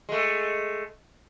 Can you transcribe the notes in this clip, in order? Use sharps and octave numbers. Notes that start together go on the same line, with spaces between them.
G#3 A3